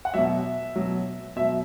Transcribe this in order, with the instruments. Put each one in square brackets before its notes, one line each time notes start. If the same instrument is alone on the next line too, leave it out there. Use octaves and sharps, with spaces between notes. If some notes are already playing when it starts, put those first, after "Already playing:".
[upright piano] F#5
B2 F#3 E5
B2 F#3
B2 F#3 E5